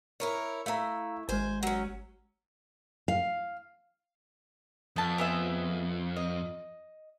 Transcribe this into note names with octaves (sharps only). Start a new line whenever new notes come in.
E4 A#4 C#5
A3 E4 F5 A#5
G#1 G#3 C5 G#5
F#3 C#4
F5
F2 B3 A5
B3 G#4 E5
D#5